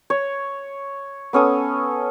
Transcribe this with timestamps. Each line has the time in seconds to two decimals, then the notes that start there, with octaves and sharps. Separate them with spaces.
0.10 C#5
1.33 B3 C#4 A4 D#6